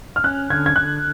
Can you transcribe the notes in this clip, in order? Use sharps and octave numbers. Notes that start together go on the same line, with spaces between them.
F6
C#4 F#6
D3 G#6
G#6
D3 F#6